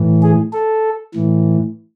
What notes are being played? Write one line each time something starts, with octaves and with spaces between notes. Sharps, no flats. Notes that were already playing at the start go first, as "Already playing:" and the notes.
Already playing: A2 E3
G#4
A4
A2 E3